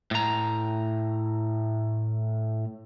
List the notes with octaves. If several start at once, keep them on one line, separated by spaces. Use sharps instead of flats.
A2 A#5